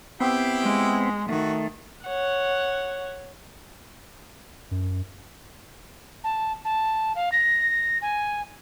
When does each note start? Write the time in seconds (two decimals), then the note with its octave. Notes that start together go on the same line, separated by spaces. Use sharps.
0.20 B3 C4 E4 G4 G5
0.62 G#3
1.29 D#3 A3 F#4
2.05 C#5 F#5
4.71 F#2
6.24 A5
6.65 A5
7.15 F5
7.32 A#6
8.02 G#5